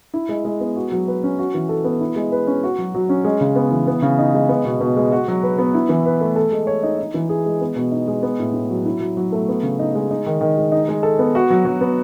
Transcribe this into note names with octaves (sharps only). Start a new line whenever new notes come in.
E4
G#3
G#3
B3
F#4
F#3
B4
C#4
F#4
E3
A4
B3
E4
G#3
B4
C#4
F#4
F#3
F#3
C#4
G#3
C#3
B3
E3
B3
C#3
D#4
G#3
B3
B2
B2
G#3
F#4
F#3
B4
B3
E4
E3
B4
A3
A4
G#3
C#5
D#4
D#4
E3
G#4
G#3
B3
B2
D#4
G#3
B3
A2
A2
F#3
E4
F#3
F#3
A3
B3
C#3
D#4
G#3
D#4
D#3
D#3
G#3
D#4
G#3
A4
B3
F#4
F#3
F#3
B3